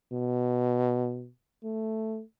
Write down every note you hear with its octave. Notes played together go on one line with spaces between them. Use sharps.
B2
A3